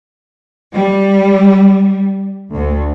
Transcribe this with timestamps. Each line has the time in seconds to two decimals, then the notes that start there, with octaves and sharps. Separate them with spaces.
0.74 G3
2.55 D2